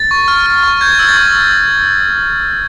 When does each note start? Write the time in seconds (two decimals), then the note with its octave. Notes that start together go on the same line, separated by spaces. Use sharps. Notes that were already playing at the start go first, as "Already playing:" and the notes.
Already playing: A6
0.11 C#6
0.28 F6
0.46 F6
0.64 C#6
0.81 G6 G#6
0.95 E6 G#6
1.09 A6
1.17 C#6